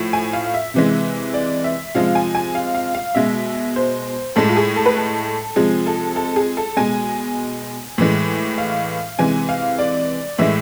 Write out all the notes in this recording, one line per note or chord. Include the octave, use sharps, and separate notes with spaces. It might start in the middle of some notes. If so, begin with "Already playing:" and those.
Already playing: A2 F3
G#5
F5
E5
C3 E3 G#3
D5
E5
C3 F3 G#3 F5
G#5
G#5
F5
F5
F5
B2 G#3 E5
C5
A2 G#3 A4
F4
G#4
A4
B4
A4
C3 F3 G#3 G#4
A4
A4
G#4
A4
B2 G#3 G#5
A2 E3 G#3
F5
C3 E3 G#3 G#5
F5
D5
A2 E3 G#3 E5